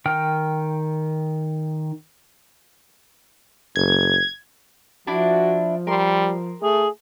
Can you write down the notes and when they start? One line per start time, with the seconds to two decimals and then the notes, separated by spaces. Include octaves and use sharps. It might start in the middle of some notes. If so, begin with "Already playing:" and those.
0.06 D#3 G5 F6
3.76 F#1 G#6
5.07 F3 D4 E4 F#4
5.87 G3 A#4 C6
6.62 A3 G#4